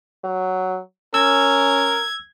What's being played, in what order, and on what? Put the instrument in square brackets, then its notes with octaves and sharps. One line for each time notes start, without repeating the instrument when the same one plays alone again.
[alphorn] F#3
[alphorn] C#4 [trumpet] A#4 [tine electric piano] E6 [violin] G#6